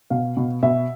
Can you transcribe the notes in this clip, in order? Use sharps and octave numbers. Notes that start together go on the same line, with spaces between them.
B2 F5
B2
B2 E5